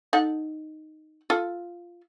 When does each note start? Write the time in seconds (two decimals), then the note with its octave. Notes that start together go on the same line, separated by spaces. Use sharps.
0.13 D#4 A4 F#5
1.30 F4 A4